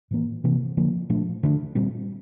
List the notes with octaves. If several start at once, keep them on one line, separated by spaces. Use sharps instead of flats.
A2 E3 A#3
C3 E3 A#3
D3 F3 A#3
A#2 F3 A3 D4
D3 A3 D4
A#2 G3 C4